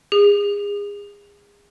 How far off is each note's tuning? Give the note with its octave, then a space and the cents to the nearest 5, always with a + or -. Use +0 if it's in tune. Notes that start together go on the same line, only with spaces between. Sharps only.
G#4 -30